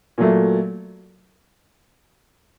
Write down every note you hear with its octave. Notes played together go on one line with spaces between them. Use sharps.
A#2 F#3 A3